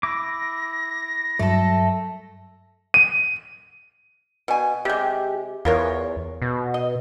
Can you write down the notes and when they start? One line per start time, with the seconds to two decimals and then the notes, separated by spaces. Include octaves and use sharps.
0.03 E4 D6 A#6
1.39 G2 F#3 A3 A4
2.94 D#7
4.48 B2 G#5
4.85 C3 G#3 G4
5.65 E2 F4 A#4 C#5
6.42 B2
6.74 D#5